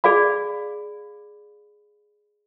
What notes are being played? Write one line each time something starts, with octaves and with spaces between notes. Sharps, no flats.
G#4 D5 F5 B5